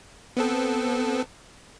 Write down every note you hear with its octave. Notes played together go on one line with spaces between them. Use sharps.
B3 C4 A4